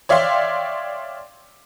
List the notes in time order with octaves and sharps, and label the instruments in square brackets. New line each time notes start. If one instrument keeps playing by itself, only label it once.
[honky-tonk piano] C#5 D5 E5 F5 G5 C6